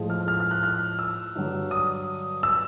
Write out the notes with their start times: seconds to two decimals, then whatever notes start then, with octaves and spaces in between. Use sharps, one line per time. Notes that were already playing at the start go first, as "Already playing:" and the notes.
Already playing: A2 F3 G#3
0.10 F6
0.28 F6
0.40 F6
0.51 F#6
0.63 F6
0.99 E6
1.35 G2 D3 F#3
1.71 D#6
2.43 E6